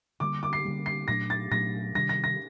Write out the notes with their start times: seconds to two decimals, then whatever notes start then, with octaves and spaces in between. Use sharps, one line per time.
0.20 D3 G3 A#3 D6
0.43 D6
0.53 C7
0.65 D3 G3 A#3
0.86 C7
1.08 A#2 F#3 A3 D4 A#6
1.30 A6
1.51 A#2 F#3 A3 D4 A#6
1.95 C3 D#3 G3 D4 A#6
2.09 A#6
2.24 A#6